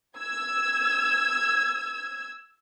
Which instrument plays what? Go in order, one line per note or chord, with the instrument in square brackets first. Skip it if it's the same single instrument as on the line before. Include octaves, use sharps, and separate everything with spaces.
[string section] E6 G#6